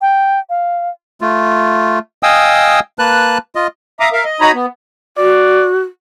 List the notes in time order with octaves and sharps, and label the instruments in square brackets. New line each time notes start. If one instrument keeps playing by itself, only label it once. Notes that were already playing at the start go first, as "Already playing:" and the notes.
[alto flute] G5
F5
[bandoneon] A3 F4
D#5 F5 G5 G#5 D#6 E6
A#3 B4 A5 F#6
F4 D#5
[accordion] E5 F5 A#5 D6 D#6
A#4 E5 F5
D#5
D#4 F#4 C#5 A#5 B5 D#6
B3
[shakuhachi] F#4 [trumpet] D5